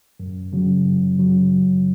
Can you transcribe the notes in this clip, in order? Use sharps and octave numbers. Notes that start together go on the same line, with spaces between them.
F#2
C#3 F#3
F#2
C#3 F#3
F#2